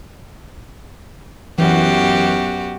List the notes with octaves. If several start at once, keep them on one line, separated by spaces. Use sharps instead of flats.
F#2 E3 B3 F#4 G4